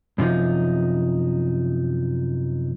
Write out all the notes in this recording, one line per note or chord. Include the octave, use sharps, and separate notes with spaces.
F#2 C3 F3 D#4